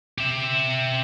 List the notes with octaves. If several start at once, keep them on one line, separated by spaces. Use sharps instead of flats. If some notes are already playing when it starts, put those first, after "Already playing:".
G4 E5